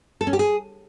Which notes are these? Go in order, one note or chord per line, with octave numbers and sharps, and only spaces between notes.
A4
C#4
G4
G#4